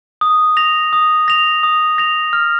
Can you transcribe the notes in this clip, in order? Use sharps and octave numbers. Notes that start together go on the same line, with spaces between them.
D#6
A#6 F7
D#6
A#6 F7
D#6
A#6 F7
F6